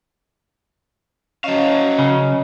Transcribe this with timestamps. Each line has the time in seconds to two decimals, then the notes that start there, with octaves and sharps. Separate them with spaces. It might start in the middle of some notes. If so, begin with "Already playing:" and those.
1.44 F#3 C#4 C#5 D#5 F5
1.99 C#3